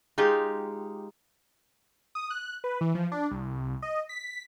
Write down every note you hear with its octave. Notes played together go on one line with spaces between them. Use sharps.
G#3 D#4 F4 G4
D#6
F#6
B4
E3
F3
D4
C2
D#5
B6